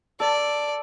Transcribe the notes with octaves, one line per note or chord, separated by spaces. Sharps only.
A4 D5